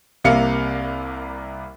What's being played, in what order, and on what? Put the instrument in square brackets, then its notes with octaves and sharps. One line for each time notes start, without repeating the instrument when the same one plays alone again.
[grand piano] C2 C3 A#3 F5 C#7